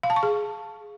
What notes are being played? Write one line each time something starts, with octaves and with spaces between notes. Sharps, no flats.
F5
A5
C#6
G#4